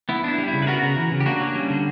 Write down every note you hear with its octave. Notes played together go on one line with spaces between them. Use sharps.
B3 E4
D4 E4
G3
C#3 E4
B4
B3 F#4 A#4
C#3
E3
C#3
G4
A#3 D4 F#4
C#4
G3
D3